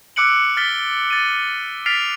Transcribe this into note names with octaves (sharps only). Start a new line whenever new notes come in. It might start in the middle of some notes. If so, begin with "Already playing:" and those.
D6 E6 F#6 C#7 D7 F#7
F6 A6 B6 G7
A6 D#7
F6 A6 B6 C7 D7 F7